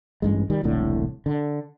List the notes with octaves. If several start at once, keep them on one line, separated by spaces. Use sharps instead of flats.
A1 G2 G#3
D#3 G3
E1 C2 A2 D3
D3